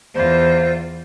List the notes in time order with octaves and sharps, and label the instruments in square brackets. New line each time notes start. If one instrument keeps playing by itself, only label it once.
[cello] E2 F4 [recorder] C5